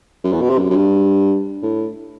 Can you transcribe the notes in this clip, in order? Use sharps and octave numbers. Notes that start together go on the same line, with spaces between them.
F#2
E2
B2
C3
F#2
F#2
G2
A2